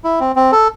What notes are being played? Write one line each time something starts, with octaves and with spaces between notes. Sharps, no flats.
E4
C4
C4
A4